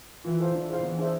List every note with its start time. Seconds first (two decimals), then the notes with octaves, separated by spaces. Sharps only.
0.24 E3 F4
0.40 A4 C5 F5
0.55 E3 D4
0.69 G#4 C5 F5
0.83 E3 B3
0.98 D4 G#4 C5 E5